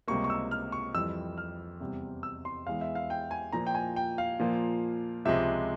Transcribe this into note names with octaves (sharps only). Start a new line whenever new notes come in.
C#2 C3 G3 A#3 C#6
C#6
E6
F6
C#6
F2 E3 G3 E6
F6
E2 C3 G3
E6
C6
E2 E3 G#3 F5
E5
F5
G5
G#5
A#2 F3 A#3 A#5
G5
G#5
G5
F5
A#2 F3 A#3
C#2 C3 F3 G#3 E5